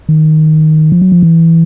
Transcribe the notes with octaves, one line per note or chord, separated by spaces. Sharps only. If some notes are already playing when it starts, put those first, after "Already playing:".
D#3
F3
F#3
F3
E3